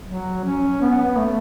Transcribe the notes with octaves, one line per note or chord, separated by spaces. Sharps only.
F#3
C#4
B3
A3